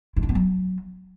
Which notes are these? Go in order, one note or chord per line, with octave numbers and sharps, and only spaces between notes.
E4
D4
B3
F#3